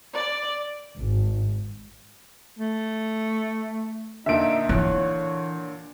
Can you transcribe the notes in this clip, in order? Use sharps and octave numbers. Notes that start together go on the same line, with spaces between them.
D5
G#1
A3
A#2 D3 D#4 E5 D7
E3 D#4 C#5 F#6